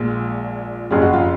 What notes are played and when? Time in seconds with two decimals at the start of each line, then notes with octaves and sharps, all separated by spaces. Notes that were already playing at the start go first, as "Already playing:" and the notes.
Already playing: A#1 A#2 G#3
0.91 F#1 F2 C#3 G#4
1.02 F#4
1.13 F4